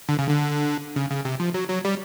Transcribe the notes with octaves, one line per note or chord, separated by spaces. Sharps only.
D3
C#3
D3
C#3
C#3
C3
F3
F#3
F#3
G3